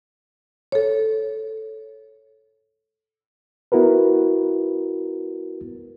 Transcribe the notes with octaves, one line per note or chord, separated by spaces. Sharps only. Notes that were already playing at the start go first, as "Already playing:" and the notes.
A4 C#5
B3 E4 F#4 A#4 B4